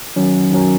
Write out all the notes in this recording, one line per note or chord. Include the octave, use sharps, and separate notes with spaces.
D#3 F#3 C#4
D#3 F#3 C#4